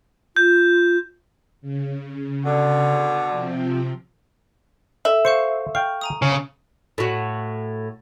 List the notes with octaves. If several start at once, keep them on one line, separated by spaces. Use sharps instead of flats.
F4 G6
C#3
B2 D3
C3 F3 C4
A4 E5
C5 F5 C#6 C#7
F5 G5 C#6
G#5 A#5 D#6
C#3 C#4
A2 F#4